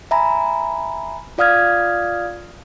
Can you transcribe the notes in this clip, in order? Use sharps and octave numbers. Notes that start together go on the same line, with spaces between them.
E5 G#5 A#5 B5
F4 D5 F5 D#6 F6 G#6